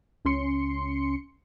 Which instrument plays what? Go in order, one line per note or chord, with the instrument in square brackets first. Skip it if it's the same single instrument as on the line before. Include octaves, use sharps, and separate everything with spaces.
[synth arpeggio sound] C#2 C#4 C6 C#7